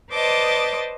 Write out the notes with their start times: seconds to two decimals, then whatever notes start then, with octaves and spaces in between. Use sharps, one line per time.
0.11 B4 C5 D5 D#5 A5 D6